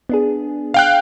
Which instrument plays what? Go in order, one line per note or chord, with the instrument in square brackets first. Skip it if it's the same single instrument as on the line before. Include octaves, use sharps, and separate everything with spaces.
[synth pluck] B3 D4 G#4
[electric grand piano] F5 G5 F#6